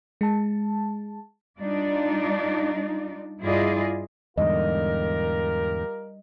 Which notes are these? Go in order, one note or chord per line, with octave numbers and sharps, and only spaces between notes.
G#3 A5
G3 D4 D#4 F4 D5
G2 E4 F4 G#4 D5 D#5
E2 G#2 D3 G3 F4 G4 A#4 D#5